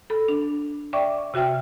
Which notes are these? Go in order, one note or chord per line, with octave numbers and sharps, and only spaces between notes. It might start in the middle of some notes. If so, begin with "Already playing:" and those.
A4 B5
D4
D5 E5 G5 C#6 D6
C3 F#4 E5 G5 F6